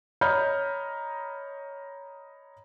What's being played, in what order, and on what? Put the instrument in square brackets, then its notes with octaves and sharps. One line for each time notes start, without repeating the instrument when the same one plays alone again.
[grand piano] C#5 D#5 A#5 B5 F6 G6